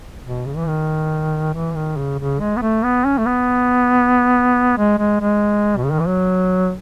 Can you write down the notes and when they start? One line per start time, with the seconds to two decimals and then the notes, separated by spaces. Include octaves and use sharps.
0.24 B2
0.46 C#3
0.57 E3
0.68 D#3
1.54 E3
1.75 D#3
1.97 C#3
2.19 C#3
2.40 G#3
2.57 B3
2.62 A3
2.83 B3
3.05 C#4
3.18 A3
3.26 B3
4.77 G#3
4.99 G#3
5.21 G#3
5.77 B2
5.85 C#3
5.92 D#3
5.99 E3
6.07 F#3